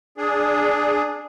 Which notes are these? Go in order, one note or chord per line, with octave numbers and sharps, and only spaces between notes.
D4 G#4